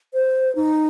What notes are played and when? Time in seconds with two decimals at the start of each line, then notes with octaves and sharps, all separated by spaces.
0.14 C5
0.55 D#4